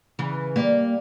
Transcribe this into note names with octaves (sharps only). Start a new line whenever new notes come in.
C#3 E3
G3 A#3